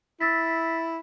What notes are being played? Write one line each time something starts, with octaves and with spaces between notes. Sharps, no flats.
E4 E6 A6 B6